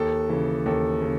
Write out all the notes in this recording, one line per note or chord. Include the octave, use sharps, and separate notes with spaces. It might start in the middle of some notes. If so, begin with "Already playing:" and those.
Already playing: D#2 A4
C#3 E3
D#2 A4
C#3